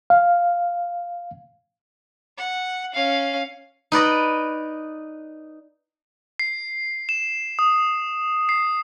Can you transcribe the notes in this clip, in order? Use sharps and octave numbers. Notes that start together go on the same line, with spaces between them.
F5
F#5
C#4 F5
D#4 B4 D5 D#5
C7
E7
D#6
C7